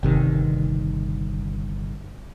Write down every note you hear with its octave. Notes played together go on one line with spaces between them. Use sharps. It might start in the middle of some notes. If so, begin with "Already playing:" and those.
G1 C3 D#3